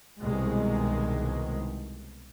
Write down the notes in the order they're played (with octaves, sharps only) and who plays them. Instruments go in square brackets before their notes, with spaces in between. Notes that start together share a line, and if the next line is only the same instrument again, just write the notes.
[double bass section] C2 B2 D#3 G#3